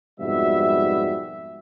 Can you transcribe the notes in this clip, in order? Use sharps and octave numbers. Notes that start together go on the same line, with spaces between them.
F2 G#2 B2 G3 E5